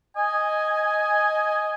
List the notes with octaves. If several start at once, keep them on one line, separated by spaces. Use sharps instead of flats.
D#5 G#5